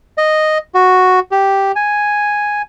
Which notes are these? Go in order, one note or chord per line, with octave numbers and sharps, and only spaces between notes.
D#5
F#4
G4
G#5